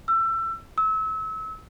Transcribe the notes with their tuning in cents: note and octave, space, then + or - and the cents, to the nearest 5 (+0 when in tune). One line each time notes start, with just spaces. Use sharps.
E6 +25
E6 -30